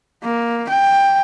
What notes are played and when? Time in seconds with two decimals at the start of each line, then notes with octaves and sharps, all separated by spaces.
0.23 A#3
0.69 G5